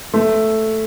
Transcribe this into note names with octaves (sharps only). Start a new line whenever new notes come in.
A3